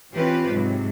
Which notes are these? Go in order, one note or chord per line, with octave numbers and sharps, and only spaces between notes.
E3 C4 C#4 F4 G4 B4
G#2 C3 F#3